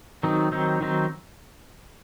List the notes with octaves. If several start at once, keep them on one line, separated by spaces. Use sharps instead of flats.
D#3 F#3 C4 D#4
D#3 F#3 C4 D#4
D#3 F#3 C4 D#4